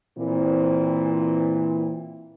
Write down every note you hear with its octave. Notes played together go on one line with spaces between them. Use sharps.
A#2 E3 C4